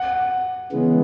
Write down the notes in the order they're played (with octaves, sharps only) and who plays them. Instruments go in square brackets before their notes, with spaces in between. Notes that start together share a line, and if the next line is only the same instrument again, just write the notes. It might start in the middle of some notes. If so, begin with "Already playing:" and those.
Already playing: [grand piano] F#5
[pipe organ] C#3 E3 G#3 B3